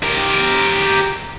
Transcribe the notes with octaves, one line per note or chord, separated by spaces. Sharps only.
G4 A#4